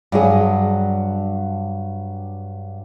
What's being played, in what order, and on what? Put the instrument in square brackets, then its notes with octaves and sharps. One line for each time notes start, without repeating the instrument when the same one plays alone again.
[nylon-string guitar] G2 F#3 G#4